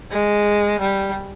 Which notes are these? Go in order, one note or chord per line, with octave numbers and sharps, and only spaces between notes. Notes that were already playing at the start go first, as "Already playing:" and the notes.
G#3
G3